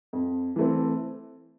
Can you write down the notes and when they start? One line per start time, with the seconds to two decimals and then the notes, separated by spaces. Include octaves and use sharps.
0.13 F2
0.56 E3 A3 C4